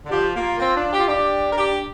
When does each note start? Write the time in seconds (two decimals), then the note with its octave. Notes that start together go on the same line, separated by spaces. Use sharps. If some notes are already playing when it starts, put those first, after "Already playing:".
0.05 D3
0.10 F3 G4
0.35 A#3 F4
0.60 C4
0.76 D4
0.93 G4
0.99 F4
1.08 D4 G4
1.51 A#4
1.57 G4